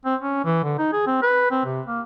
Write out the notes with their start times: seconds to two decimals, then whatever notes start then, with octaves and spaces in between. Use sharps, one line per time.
0.05 C4
0.21 C#4
0.45 E3
0.64 D3
0.79 D#4
0.93 G#4
1.07 C4
1.22 B4
1.51 C4
1.65 C3
1.86 A#3